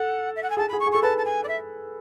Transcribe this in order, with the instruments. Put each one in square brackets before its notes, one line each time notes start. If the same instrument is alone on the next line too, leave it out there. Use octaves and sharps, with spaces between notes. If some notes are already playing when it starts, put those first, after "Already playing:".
Already playing: [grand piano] A4 [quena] F#5
[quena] E5
F#5
G#5
[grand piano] G#4 [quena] A5
[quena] B5
[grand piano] G#4
[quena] C#6
[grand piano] G#4
[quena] C#6
[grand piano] A4
[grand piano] B4 [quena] A5
[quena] A5
G#5
D5
E5